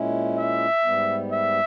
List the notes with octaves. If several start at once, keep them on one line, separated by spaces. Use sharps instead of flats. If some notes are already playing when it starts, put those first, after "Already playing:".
Already playing: A#2 G#3 C#4 E4
E5
G#2 G3 B3
E5